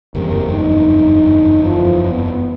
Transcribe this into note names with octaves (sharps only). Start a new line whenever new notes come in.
F#1 E2 G2 C4 G4 A#4
D#4
D3 E3 F3
B3